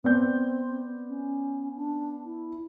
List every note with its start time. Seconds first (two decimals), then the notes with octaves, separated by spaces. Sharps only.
0.04 B3 C4 D5 G6
1.08 C#4
1.76 D4
2.25 E4